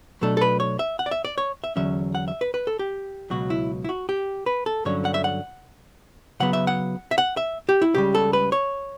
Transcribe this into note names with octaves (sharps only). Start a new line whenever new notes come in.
B2 F#3 A3 D4 A4
A4
B4
C#5
E5
F#5
D5
E5
D5
C#5
E5
E2 D3 F#3 C#4 E5
F#5
E5
B4
B4
A4
G4
C#2 B2 F#3 F#4
E4
E4
F#4
G4
B4
A4
G2 D3 F#3 C#4 C#5
F#5
E5
F#5
C#3 F#3 B3 F#5
E5
F#5
E5
F#5
E5
G4
E4
C#2 C#3 G3 G4
A4
B4
C#5